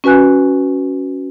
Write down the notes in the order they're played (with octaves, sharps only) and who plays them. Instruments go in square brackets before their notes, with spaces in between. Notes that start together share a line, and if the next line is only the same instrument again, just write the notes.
[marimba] C#4 F#4 B4 G#5 F#6